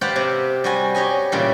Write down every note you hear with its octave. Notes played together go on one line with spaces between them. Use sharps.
G4 B4 C5 D5 F5 F#5
C3
G3 F#4 G#5
G4 C#5 D#5 G#5
A#2 C#3 E3 G3